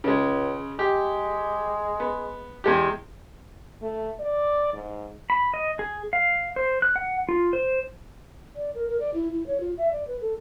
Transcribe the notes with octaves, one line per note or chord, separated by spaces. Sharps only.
C#2 C#3 G#3
G#3 G4
B3
E2 G#3 G4
A3
D5
G#2
B5
D#5
G#4
F5
C5
F#6
F#5
F4
C5
D5
A#4
A#4
D5
E4
E4
C#5
F4
E5
D5
B4
A4